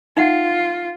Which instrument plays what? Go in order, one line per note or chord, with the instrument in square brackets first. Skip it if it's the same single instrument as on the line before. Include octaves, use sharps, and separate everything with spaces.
[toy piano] D#4 E5 F#5 [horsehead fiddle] F4